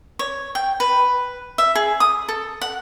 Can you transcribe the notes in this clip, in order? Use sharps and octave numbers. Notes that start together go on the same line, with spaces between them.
C#5
G5
B4
E5
G#4
D#6
A4
F#5